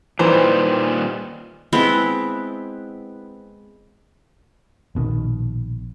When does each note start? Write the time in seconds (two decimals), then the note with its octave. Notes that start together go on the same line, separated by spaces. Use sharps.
0.19 A#2 D#3 E3 G3 C5
1.73 G#3 B3 C4 E4
4.95 A#1 B2 D#3